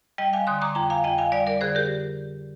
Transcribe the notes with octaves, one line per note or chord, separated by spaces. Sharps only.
G3 D#5 G5
F5 G#5
D3 C6 D#6
A#5 D6
F2 G5 A#5
F5 G#5
F2 D#5 G5
F5 G#5
G3 D5 F5
A#4 D5
D3 G#4 C5
G4 A#4